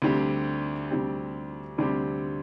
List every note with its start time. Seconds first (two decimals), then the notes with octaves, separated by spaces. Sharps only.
0.02 D2 D3 G3 C4 G4
0.91 D2 D3 G3 C4 G4
1.78 D2 D3 G3 C4 G4